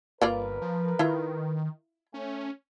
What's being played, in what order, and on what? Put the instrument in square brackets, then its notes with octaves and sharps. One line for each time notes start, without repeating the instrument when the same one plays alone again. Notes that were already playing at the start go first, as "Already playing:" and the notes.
[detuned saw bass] G1 [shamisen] A#3 F4 D5 [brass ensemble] A#4 B4
[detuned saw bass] F3
[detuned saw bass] D#3 [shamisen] E4 F4
[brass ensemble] A3 G#5 [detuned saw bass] C#4